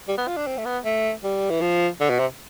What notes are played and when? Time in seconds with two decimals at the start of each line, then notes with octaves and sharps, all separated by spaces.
0.08 G3
0.18 B3
0.27 F4
0.37 D4
0.47 C4
0.57 A3
0.65 B3
0.85 A3
1.24 G3
1.50 E3
1.61 F3
2.00 D3
2.10 B2
2.19 C3